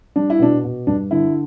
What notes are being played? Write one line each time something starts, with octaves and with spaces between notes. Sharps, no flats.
G3 D4
E4
B2 D4
B2
G2 D4
D3 E4